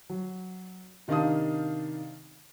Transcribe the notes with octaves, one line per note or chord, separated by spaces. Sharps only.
F#3
C3 D#3 D4 F5 A5 D#6